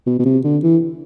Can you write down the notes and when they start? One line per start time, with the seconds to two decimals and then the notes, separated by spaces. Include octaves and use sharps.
0.06 B2
0.19 B2
0.25 C3
0.44 D3
0.63 E3